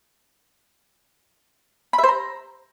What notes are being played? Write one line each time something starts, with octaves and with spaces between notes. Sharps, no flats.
B5
E5
C5
A#5